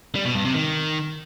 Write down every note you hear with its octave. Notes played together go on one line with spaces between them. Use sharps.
G3
B2
G2
C3
D#3